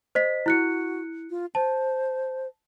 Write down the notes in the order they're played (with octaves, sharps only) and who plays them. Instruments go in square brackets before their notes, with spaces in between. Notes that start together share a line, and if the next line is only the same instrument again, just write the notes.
[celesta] C5 D#5 B6
[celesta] E4 F#6 C#7 [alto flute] F#4
[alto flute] F4
[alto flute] C5 [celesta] A5